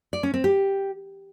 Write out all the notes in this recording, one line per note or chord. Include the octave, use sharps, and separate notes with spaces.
D5
C#4
C4
G4